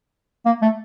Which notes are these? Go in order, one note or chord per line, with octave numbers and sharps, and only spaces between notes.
A#3
A3